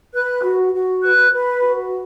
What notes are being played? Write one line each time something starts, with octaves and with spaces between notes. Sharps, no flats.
B4 F#6
F#4
F#4
B4 F#6
B4
F#4